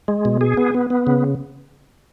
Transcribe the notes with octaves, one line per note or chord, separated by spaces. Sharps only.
G#3
B2
G#4
B3
B3
B3
C#3